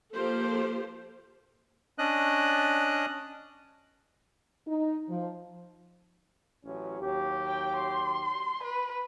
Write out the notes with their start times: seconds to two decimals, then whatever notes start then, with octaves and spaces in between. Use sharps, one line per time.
0.13 F3 A#3 G4 A4 C5
1.98 C#4 D4 D#5 F#6
4.67 D#4
5.09 F3
6.65 A1 F#3 C#4
7.01 D#2 F#3 G4
7.46 G5
7.77 C6
8.63 B4